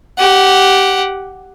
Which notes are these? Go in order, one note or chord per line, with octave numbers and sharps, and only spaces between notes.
G4 F#5